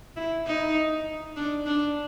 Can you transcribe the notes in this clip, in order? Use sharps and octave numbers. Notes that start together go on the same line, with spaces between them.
E4
D#4
D4
D4